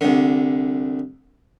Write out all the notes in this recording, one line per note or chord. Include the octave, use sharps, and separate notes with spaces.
C2 D3